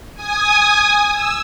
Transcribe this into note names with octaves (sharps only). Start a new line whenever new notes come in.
G#5 D#6
E6